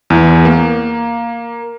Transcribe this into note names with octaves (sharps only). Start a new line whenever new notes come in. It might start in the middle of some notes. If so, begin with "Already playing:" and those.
E2
A#3